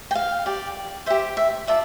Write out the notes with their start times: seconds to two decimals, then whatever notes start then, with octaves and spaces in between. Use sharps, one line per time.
0.11 G5
0.15 F5
0.46 G4 D5
1.06 G4 C5 E5
1.37 E5
1.67 F4 A4 D5 E5